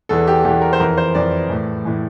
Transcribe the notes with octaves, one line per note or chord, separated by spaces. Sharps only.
E2 E3 A4
G4
E2 E3 G4
A#4
C5
F2 E3 A#4
C5
F2 E3 D5
A2 E3
A2 E3